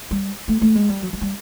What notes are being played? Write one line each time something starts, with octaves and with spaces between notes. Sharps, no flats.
G3
A3
A3
G#3
G3
F#3
F#3
G3